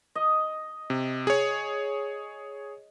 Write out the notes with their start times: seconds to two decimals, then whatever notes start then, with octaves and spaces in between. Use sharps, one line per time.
0.15 D#5
0.90 C3
1.27 G#4 C#5